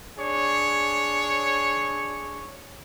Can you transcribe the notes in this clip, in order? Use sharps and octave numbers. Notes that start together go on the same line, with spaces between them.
D4 G#4 C#5